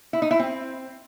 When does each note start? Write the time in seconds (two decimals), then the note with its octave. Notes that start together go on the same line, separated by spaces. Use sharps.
0.13 E4
0.22 D#4
0.31 E4
0.39 C4